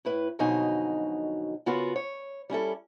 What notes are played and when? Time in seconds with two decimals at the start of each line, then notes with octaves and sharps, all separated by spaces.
0.05 A2 E4 B4
0.39 F2 B2 D3 F#3 D#4 G#5
1.66 C#3 B3 F4 F#4 A#4 B4
1.96 C#5
2.50 G3 C#4 E4 A4